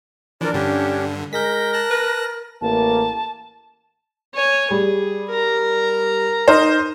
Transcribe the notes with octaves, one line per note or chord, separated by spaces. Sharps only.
E3 F3 D4 A#4 D5
G2 D3 C#4 G4
G#3 A#4 G6 A#6 B6
A5 F#6 A#6
B4
A1 A#3 A5
C#5 G#5
G3 G#4
A#4 A#5
D#4 C5 D#5 F6